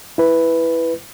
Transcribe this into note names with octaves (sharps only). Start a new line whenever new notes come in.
E4 B4